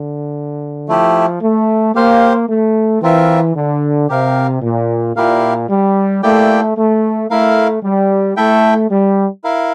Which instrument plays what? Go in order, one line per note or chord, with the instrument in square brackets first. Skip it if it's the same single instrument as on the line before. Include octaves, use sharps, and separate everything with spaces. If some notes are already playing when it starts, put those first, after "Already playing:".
Already playing: [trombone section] D3
[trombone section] F3 [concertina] A3 E4 G4
[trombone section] A3
[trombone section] A#3 [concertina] G4 C5 F5
[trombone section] A3
[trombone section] E3 [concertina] C4 F4 A#4 E5
[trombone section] D3
[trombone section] C3 [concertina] G4 A#4 F5
[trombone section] A#2
[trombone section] A#2 [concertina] E4 G4 A#4 F5
[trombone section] G3
[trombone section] A3 [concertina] A#3 E4 G4 D5 G5
[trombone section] A3
[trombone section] A3 [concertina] E4 A#4 F5
[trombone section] G3
[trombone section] A3 [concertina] E4 A4 E5 G5
[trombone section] G3
[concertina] E4 A#4 F5